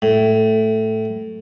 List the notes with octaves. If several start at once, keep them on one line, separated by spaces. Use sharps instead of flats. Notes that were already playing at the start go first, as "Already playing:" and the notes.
A2